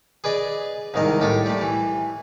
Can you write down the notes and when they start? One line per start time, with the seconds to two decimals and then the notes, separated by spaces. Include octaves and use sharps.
0.24 G#4 B4 D5 D#5
0.94 C2 G#2 D#3 D#5
1.20 A2 G4 A4
1.46 G3 A3
1.61 E3